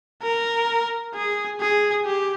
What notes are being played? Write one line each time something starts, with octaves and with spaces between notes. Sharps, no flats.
A#4
G#4
G#4
G4